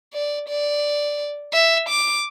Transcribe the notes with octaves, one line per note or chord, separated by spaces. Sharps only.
D5
D5
E5
D6